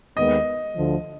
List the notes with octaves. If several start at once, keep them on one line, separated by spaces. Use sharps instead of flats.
D#2 D#3 G#3 B3 D#5
D2 D3 F3